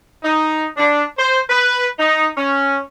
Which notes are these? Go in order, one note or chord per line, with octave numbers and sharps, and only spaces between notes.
D#4
D4
C5
B4
D#4
C#4